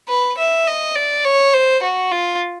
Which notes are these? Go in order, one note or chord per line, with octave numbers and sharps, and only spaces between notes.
B4
E5
D#5
D5
C#5
C5
F#4
F4